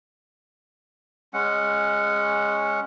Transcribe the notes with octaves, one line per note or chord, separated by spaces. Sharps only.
G#3 C#4 F#5